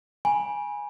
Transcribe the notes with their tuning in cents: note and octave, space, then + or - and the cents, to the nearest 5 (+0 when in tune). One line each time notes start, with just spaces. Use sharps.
G#5 -5 B5 -35